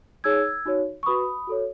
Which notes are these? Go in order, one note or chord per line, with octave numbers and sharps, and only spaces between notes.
D#4 G#4 C#5 E6 G#6
D#4 F#4 C#5
C#6
F#4 B4 B5 D#6
F#4 A4 C#5